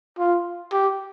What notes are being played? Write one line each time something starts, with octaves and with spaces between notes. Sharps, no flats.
F4
G4